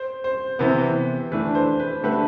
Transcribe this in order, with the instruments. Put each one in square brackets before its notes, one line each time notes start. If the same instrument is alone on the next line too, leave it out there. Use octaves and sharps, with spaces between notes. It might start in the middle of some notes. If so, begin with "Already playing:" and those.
Already playing: [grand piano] C5
C5
[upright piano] C3 E3 B3
[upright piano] E3 A3 D4 [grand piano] B4
[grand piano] C5
B4
[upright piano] D3 A3 D4 G4 B4 [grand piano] A4